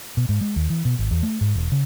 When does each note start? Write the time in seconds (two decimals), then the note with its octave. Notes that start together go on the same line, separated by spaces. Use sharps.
0.17 B2
0.29 G#2
0.41 G#3
0.56 D#2
0.70 E3
0.85 B2
0.99 G#1
1.11 E2
1.23 A3
1.41 G#2
1.55 E1
1.72 C#3